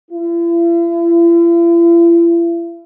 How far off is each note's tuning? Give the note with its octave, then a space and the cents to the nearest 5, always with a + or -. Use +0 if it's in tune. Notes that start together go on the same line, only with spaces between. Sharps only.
E4 +45